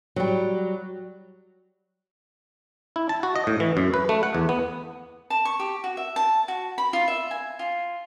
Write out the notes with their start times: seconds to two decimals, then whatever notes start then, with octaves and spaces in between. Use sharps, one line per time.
0.16 F#3 G3
2.96 E4
3.09 A5
3.23 F#4
3.36 D#5
3.47 A2
3.60 E3
3.77 F#2
3.94 B4
4.09 A3
4.23 F#5
4.35 E2
4.49 B3
5.30 A5
5.45 C#6
5.59 G4
5.84 F#4
5.97 E5
6.16 A5
6.48 F#4
6.78 B5
6.93 F4
7.08 E5
7.31 G#5
7.59 F4